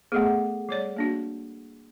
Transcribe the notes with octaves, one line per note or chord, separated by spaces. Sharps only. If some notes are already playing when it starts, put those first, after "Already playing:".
A3 B3 G#4 A4 F#5
G3 C#5 D5
A#3 D4 F#4